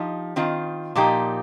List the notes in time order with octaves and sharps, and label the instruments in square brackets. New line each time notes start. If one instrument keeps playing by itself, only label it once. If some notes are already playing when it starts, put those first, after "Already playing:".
Already playing: [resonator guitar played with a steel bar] F3 D#4 G4
D#3 C4 F4
A#2 F3 A#3 D#4 G4